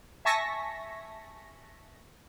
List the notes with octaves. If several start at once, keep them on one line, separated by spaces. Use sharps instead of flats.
E5 G#5 A5 C#6 A#6 B6